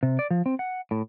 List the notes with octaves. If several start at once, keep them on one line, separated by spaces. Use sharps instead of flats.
C3
D5
F3
C4
F#5
A2